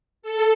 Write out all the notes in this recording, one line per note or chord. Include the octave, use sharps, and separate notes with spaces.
A4